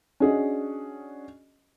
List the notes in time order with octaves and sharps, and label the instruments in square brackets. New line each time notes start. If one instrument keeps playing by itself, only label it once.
[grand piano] C#4 D4 F#4 G#4 D#5